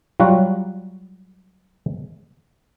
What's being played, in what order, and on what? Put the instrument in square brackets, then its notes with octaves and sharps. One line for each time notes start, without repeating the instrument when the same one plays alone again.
[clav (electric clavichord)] F#3 G3 F4 F#4